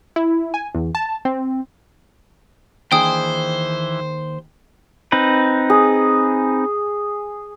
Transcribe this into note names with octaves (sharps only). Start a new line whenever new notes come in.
E4
G#5
E2
A5
C4
D#2 E3 D4 G#4 C5 G5 D#6
C4 D#4 B4
G#4